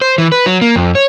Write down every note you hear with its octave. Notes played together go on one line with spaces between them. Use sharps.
C5
E3
B4
F#3
A#3
F2
C#5